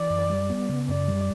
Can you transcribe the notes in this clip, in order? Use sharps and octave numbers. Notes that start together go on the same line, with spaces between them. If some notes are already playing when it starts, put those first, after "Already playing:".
Already playing: E3 D5
F#2
G3
B3
C#3
F#2 D5
G3